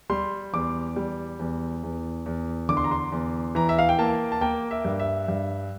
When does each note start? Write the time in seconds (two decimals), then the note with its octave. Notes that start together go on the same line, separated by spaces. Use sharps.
0.10 G3 C6
0.53 E2 D6
0.96 G3
1.39 E2
1.83 E2
2.26 E2
2.69 D3 D6
2.77 C6
2.84 A#5
2.91 C6
3.12 E2
3.55 E3 A#5
3.69 E5
3.79 F5
3.89 G5
3.99 A#3 A5
4.32 A5
4.41 A#3 G5
4.71 E5
4.85 G2
5.00 E5
5.28 G2